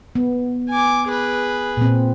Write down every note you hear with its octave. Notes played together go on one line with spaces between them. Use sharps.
B3
G#5 D6
G#4 B4
A#2 C4